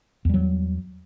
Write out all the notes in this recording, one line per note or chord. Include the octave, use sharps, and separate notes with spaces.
E2 F#3 G3